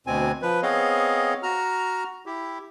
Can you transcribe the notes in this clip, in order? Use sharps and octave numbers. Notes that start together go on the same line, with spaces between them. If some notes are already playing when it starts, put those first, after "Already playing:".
D2 B2 C4 G#5
F3 B4
B3 C4 G#4 C#5 D#5 F5
F#4 A#5 F6
E4 G4